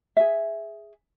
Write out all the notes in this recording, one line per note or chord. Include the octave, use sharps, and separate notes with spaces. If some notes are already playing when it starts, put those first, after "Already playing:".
G#4 E5